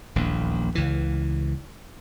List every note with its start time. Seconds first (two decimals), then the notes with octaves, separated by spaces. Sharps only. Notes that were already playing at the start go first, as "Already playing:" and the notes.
0.16 D#1 A#1 E2
0.75 C#2 E3